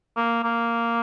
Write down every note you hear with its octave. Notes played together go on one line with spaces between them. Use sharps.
A#3
A#3